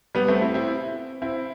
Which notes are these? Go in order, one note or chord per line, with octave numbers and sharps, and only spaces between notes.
G3 B3
A3 C4
C4 E4
C4 E4
C4 E4